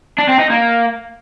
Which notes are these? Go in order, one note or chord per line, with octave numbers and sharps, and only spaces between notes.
D4
C4
D#4
A#3